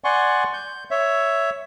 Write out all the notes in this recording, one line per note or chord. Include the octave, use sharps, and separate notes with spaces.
D5 F#5 G#5 C6 C#6
G6
C#5 E5